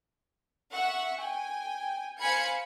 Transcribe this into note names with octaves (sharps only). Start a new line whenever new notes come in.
E5 F#5 C#6
G5 G#5
C5 F5 G#5 B5 G#6 C#7